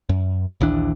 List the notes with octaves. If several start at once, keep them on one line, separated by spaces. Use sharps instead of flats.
F#2
A#1 D#2 E3 D4